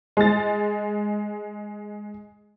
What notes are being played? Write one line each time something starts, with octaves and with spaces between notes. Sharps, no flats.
G#3 A6